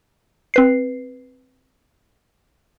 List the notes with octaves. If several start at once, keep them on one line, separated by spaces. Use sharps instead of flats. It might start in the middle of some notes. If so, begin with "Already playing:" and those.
C4 B4 C7